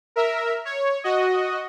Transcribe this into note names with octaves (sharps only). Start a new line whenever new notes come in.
A#4 E5
C#5
F#4 D#5